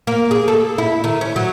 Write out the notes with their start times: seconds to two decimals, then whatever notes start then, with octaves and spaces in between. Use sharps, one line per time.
0.07 A#3
0.31 G#4
0.48 A4
0.78 E4
1.04 D#3
1.21 C#4
1.36 F#3